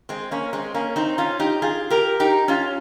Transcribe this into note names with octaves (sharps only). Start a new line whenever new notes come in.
G#3 C4
A#3 C#4
G#3 C4
A#3 C#4
C4 D#4
C#4 F4
D#4 G4
F4 G#4
G4 A#4
D#4 G4
C#4 F4